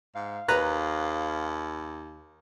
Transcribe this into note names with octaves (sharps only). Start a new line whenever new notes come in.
G#2 F5
D#2 B4 A#5 F#6